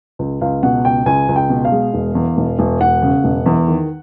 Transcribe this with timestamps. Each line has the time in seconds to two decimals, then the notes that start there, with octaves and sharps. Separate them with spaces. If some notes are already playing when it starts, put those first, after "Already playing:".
0.19 C#2
0.41 C#2 F5
0.63 B2 F#5
0.85 C#2 G5
1.06 C#2 G#5
1.29 C#2
1.36 G5
1.50 B2
1.65 F5
1.72 G#3
1.94 E1
2.15 E2
2.37 E1
2.59 E1
2.81 E1 F#5
3.02 C#3
3.24 E1
3.46 E2
3.68 D#3